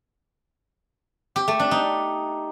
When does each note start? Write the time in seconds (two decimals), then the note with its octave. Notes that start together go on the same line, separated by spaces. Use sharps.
1.36 G4
1.48 A3
1.60 D4
1.71 D#4